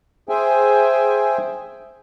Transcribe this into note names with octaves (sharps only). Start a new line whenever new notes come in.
G#4 C5 E5 G5 G#5